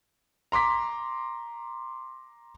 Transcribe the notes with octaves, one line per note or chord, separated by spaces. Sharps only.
A#5 C6 D6 B6